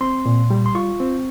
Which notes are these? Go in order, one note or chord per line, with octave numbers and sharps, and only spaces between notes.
C4 C6
A#2
G3
C6
F4 C#6
C4